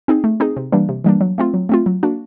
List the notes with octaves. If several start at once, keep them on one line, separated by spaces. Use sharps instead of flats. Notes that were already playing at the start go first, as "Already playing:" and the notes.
C4 D#4 G#4
A3
C4 D#4 G#4
C3
E3 G3 A#3 D4
C3
E3 G3 A#3 D4
F#3
A3 C4 F4
F#3
A3 C4 F4
F#3
A#3 D4 F#4